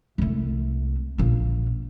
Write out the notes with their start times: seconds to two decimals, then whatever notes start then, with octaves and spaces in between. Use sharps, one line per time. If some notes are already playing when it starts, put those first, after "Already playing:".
0.18 C2 A3
1.18 A#1 A#3